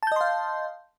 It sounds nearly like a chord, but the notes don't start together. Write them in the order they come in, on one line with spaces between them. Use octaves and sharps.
A5 G6 D#5 C6 F5